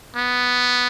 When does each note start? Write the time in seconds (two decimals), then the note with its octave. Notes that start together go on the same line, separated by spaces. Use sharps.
0.16 B3